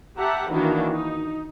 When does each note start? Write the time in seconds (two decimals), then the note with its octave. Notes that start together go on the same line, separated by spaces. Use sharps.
0.18 G4 E5 F#5 A5 A#5
0.51 D#3 E3 A#3 D4 D#4 F#4
0.92 D#4